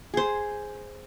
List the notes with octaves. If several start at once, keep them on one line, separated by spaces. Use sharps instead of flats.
G#4 C5